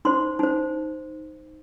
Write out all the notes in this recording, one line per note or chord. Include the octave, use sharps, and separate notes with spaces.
D#4 C5 C6
D#4 C5